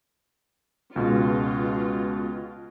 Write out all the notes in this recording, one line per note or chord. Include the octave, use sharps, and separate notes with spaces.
C#2 B2 G#3 F4